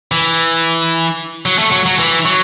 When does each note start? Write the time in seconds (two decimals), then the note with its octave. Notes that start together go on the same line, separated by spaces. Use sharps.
0.12 E3
1.46 F#3
1.59 A3
1.72 F#3
1.86 F#3
1.99 E3
2.25 F#3